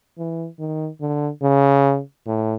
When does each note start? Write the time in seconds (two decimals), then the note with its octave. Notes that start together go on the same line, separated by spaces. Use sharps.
0.18 E3
0.59 D#3
1.01 D3
1.42 C#3
2.27 A2